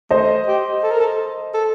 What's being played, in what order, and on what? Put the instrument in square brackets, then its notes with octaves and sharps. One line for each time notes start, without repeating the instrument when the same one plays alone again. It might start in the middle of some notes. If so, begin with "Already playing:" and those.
[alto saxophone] A3 [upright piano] C5 D#5
[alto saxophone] G4
A4
A#4
A4
A4